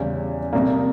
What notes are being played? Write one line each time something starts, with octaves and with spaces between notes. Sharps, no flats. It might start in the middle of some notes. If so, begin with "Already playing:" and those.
Already playing: E2 C#3 G3 C#4
F2 C3 G3 A#3